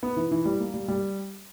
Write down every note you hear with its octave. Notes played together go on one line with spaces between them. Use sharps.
B3
E3
E3
G3
A#3
G3
G3